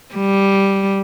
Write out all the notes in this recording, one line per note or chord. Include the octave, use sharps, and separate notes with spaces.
G3